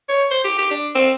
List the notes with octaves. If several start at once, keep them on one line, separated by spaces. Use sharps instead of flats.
C#5
C5
G4
G4
D4
C4